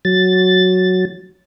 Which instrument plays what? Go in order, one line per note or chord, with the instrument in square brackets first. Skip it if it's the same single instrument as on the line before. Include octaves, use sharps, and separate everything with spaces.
[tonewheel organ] F#3 A6